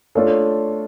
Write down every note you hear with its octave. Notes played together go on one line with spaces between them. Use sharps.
A3 D4 F4 A4 C#5